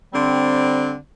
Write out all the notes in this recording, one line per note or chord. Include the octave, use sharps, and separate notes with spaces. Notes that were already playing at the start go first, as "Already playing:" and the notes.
D3 G3 C4